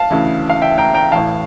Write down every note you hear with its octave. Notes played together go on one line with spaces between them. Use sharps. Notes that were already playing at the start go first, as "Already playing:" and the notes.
Already playing: F5 A5
D2 C#3 E3
F5
E5 G5
G5 A#5
G5 A#5
A1 A2 E3 F5 A5